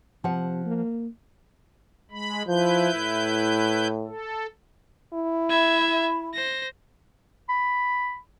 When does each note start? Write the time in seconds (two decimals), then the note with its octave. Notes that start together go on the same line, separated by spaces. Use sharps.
0.24 C3 F3 F#5
0.66 A#3
2.11 G#3 B5
2.48 F3 E4 B4 G6
2.95 A2
4.07 A4
5.14 E4
5.50 E5 B5 G#6
6.34 C5 A#6
7.49 B5